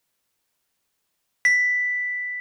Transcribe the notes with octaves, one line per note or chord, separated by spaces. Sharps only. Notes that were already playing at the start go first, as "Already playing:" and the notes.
B6